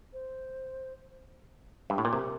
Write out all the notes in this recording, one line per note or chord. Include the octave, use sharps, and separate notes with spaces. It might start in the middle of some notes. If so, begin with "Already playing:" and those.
C5
G2
A2
A#2
C3 A#4